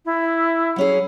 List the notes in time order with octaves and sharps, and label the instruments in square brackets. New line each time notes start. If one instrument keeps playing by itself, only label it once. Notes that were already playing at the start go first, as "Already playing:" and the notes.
[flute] E4
[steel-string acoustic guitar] F#3 C#4 G#4